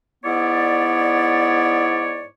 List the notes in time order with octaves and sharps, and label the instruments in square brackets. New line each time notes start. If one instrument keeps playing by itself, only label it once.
[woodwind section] G#2 B3 E4 C#5 D5